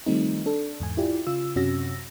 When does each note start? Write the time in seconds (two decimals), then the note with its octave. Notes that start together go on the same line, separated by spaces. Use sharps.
0.06 D#3 F3 G3 A3 C4 D#4
0.46 D4 A4
0.80 E2 G#2 G#5
0.97 E4 F4 G4 D5
1.27 C#3 F4 E6
1.56 F#2 C3 C#4 F#4 E6 A#6